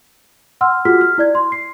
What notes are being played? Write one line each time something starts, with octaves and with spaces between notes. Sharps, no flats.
F#5 C6 E6 F6
F4 F#4 G#4 F6 B6
F6
E4 D5 G#6
C6
C7